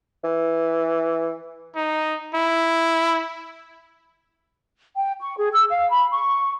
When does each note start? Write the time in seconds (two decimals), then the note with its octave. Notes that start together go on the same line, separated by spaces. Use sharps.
0.24 E3
1.76 D#4
2.34 E4
4.96 G5
5.21 C#6
5.37 G#4
5.53 E6
5.70 F5
5.89 B5
6.12 C#6